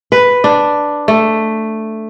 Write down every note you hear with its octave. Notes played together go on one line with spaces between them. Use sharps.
B4
D4
A3